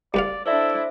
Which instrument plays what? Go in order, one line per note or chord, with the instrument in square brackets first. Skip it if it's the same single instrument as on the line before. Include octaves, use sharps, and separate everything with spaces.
[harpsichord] C2 B4 F5 [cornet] D5
[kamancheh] D4 E4 [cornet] A4 [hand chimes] C5 D5 E5